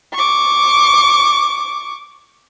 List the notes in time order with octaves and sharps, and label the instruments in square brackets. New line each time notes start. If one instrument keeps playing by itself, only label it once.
[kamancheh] C#6 D6